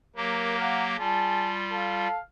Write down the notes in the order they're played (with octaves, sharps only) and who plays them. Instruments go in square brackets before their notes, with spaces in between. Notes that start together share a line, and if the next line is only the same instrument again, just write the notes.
[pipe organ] F#3 A#3 G4 [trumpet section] A#4
[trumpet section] F5 F#5 A#5
[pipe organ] G3 F4 [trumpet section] G#4 A5
[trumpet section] A4 F5 A5